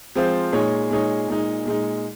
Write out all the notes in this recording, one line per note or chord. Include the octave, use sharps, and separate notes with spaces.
F3 G#3 C4 F4 C5
A#2 G#3 D#4 G#4 C#5
A#2 G#3 D#4 G#4 C#5
A#2 G#3 D#4
A#2 G#3 D#4